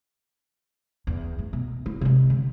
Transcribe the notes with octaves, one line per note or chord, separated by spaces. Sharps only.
E2
A2
B2
E4
C3 G#3
D3